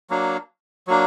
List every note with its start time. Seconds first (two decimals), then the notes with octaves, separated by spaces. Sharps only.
0.10 F#3 A#3 D4
0.87 F#3 A#3 D4